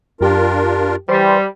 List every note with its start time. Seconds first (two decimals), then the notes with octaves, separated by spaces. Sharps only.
0.21 F#2 D4 F4 G4 A#4
1.09 E3 G3 C5 C6